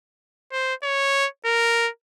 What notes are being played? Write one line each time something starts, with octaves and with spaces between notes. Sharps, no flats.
C5
C#5
A#4